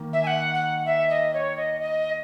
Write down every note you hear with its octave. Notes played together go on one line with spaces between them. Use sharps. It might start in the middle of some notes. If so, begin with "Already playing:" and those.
Already playing: D#3 A#3
E5
G#5
F#5
F#5
E5
D#5
C#5
D#5
D#5